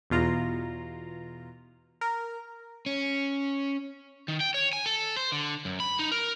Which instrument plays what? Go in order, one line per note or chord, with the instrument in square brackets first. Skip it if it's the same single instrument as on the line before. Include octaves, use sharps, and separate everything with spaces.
[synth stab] E2 B2 F4 A#5
A#4
[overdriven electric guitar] C#4
D#3
G5
C#5
G#5
A4
C5
D3
F#2
B5
D#4
A#4